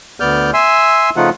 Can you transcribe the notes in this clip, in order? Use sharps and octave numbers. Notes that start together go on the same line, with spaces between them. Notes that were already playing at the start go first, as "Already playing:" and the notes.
D2 B3 D5 F6 G6
E5 G#5 C6 E6
C#3 F3 A3 D#4 F4 F#5